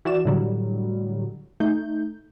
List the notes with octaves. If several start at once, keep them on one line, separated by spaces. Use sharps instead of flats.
E3 F#4 D5 E7
A2 D3 F#3 G3
A3 D#4 G6